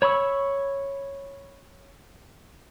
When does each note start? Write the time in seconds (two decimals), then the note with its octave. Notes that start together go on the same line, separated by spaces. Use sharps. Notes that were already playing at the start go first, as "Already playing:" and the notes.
0.02 C#5 B5 C#6 E6